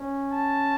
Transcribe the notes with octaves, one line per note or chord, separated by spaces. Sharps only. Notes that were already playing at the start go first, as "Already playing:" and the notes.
Already playing: C#4
A5